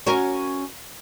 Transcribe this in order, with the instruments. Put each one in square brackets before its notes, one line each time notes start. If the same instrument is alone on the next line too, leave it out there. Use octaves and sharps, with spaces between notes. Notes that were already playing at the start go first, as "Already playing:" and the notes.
[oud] C#4 F#4 A#4